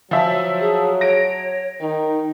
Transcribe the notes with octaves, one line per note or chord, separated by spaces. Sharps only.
F3 F#3 E5
G#4
C#5 A#6 D7
D#3 D#4